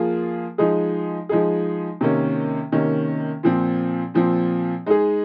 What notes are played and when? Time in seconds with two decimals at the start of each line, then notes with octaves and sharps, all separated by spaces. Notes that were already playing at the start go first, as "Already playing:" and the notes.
Already playing: F3 A#3 F4 G#4
0.58 F3 G#3 D#4 G#4
1.29 F3 G#3 D#4 G#4
2.01 C3 D#3 A#3 C#4
2.72 C3 D#3 A#3 C#4
3.43 A#2 F3 C4
4.14 A#2 F3 C4
4.86 G#3 D#4 G#4